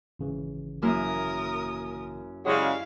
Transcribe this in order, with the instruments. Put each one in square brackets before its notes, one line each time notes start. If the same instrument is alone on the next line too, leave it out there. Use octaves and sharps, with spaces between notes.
[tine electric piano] G#1 C#3 E3
[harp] F#2 A#3 E4 [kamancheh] A#4 D#6
[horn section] C#3 F#3 G#3 [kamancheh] E4 F5 [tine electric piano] G4 D5 D#5